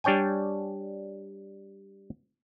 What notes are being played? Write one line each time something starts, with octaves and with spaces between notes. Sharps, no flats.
G3 D4 C#5 G5 G#5